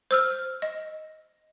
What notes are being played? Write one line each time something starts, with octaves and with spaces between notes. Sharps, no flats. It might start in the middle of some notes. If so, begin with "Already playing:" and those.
C5 E6 F6
D#5